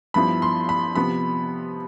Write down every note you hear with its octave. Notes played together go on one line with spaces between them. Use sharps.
G2 F3 B3 E4 B5
C6
B5
C3 F3 B3 B5